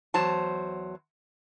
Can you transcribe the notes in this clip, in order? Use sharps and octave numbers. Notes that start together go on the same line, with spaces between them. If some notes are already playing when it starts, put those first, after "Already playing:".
E2 F#3 C5 A5